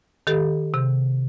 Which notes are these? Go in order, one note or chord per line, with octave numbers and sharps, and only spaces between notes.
D#3 G4 A4
C3